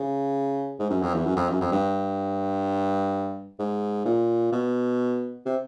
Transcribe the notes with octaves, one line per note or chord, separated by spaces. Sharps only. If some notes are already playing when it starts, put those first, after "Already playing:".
Already playing: C#3
G#2
F#2
F2
E2
F#2
F2
F#2
F2
G2
G#2
A#2
B2
C3